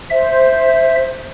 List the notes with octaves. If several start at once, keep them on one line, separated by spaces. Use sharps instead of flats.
C5 E5